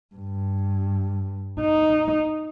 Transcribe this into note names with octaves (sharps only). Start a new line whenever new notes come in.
G2
D#4